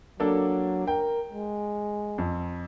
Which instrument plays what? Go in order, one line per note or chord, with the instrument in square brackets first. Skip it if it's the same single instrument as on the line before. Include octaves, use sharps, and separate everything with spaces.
[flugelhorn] F#3 [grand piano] A#3 D4 A4
[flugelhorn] A#4 [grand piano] G5
[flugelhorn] G#3
[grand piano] F2